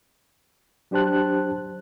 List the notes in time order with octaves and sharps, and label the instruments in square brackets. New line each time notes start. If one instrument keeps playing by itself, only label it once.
[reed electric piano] F#3 D4 G4 C5 A5 F#6